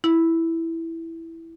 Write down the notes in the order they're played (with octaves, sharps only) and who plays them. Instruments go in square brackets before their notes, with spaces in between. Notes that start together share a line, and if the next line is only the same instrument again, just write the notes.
[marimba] E4